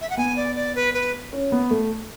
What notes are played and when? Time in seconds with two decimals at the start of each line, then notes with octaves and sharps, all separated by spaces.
0.01 E5
0.10 F#5
0.17 B3 G#5
0.36 D5
0.56 D5
0.75 B4
0.94 B4
1.33 C#4
1.52 B3
1.71 A3